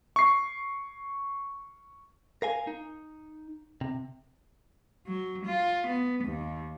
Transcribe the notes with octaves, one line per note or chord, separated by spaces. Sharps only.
C#6 C7
A#4 F5 G#5
D#4
C3
F#3
F4
B3
D#2